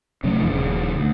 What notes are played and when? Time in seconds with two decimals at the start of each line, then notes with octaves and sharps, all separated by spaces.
0.23 C3 F#3 A3 C#4
0.38 E1 F2 D3 E3
0.50 D#1 C#3
0.96 D2